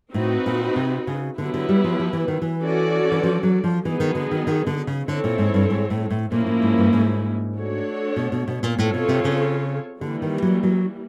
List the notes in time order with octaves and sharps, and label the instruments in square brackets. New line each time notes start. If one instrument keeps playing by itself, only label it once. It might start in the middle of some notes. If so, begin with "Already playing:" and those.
[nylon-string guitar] A2 [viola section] C4 D#4 F#4 B4
[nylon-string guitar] A#2
C3
C#3
[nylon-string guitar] D3 [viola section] F#3 B3 E4 G4 B4
[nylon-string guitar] D3
G3
F3
F3
E3
D#3
E3
[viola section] C#4 F#4 A4 D5
[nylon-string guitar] E3
F3
F#3
F3
[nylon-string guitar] E3 [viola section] F#3 B3 D#4 G#4
[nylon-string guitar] D#3
D3
D#3
D#3
D3
C#3
[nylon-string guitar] D3 [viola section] C4 E4 A4 C#5
[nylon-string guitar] A#2
G#2
G2
G#2
A2
A2
[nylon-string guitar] A#2 [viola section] F3 A#3 C#4 E4
[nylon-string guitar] A2
G#2
G2
G#2
[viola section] A3 D4 F#4 A4 C#5
[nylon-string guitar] B2
B2
B2
A#2
[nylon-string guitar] A2 [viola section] C4 F4 A4 C#5
[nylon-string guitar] B2
C3
C#3
[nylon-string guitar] D3 [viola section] E3 G3 A#3
[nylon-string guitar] D#3
F#3
F#3